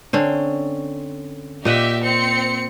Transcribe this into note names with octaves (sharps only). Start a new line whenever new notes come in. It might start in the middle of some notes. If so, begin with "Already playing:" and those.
D3 C4 C#4
A#2 G4 D#5 E5 F#5
C4 C#7